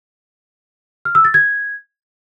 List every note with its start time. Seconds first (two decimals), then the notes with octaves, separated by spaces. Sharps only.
1.05 F6
1.15 E6
1.25 A6
1.34 G#6